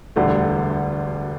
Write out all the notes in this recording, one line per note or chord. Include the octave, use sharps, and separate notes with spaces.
E1 D2 D3 G3 A3